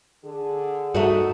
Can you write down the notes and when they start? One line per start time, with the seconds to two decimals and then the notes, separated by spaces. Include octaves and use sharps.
0.24 D3 G#4
0.94 G2 A3 D#4 F#4